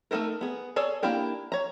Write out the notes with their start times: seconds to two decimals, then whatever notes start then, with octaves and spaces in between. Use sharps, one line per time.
0.11 A3 C4 D#4 A4 A#4
0.41 B3 G#4
0.76 G#4 A4 C#5 D5
1.03 A#3 D4 E4 G4 A#4
1.52 C#5 A#5